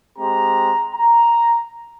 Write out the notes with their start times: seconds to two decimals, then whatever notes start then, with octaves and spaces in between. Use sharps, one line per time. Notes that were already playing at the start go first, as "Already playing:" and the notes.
0.19 G#3 C4 G4 A#5
0.95 A#5